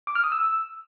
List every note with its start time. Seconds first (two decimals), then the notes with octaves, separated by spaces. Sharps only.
0.07 D6
0.15 F6
0.24 D#6
0.32 E6